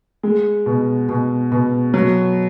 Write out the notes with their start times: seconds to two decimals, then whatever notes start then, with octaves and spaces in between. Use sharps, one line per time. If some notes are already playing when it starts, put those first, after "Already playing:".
0.23 G#3
0.66 B2
1.09 B2
1.52 B2
1.94 F#3